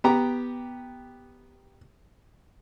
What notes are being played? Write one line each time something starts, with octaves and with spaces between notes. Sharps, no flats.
B3 G4 A#5